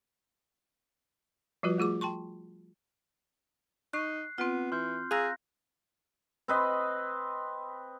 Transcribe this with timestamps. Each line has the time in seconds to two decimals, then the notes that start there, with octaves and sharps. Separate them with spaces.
1.63 F3 G3 F4 F#4 B4
1.78 A3 F4 G#4 D6
2.01 G5 A5 C6 C#6
3.93 D#4 C#6 F#6 C7
4.38 B3 C4 F4
4.72 E3 C6 F6 G6
5.11 G#4 F5 A#5 E6 F#6 A#6
6.48 C4 B4 D#5